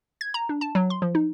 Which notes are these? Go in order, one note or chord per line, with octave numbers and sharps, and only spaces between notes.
G#6
A#5
D4
A5
F#3
C6
F3
D#4